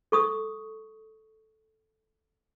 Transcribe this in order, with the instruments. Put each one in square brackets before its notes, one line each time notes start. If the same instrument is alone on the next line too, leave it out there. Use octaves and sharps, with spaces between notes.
[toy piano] A4 C#6 D#6